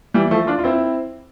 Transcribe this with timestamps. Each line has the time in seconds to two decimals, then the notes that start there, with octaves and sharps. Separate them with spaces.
0.14 E3 G3
0.31 F3 A3
0.47 D4 F4
0.59 F4
0.64 C4 E4